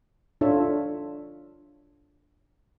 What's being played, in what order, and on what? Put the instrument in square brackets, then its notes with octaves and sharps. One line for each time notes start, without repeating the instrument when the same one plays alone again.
[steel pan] D4 F4 A4 C#5 E5